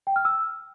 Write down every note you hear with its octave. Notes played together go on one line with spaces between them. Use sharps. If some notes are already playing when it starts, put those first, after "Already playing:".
G5
F6
E6